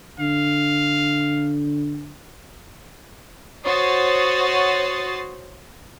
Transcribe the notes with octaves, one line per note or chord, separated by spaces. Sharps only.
D3 F5
F#4 C5 C#5 D#6 A6 C7